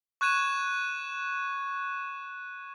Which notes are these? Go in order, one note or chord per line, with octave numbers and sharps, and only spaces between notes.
C#6 F#6 G#6 D#7 E7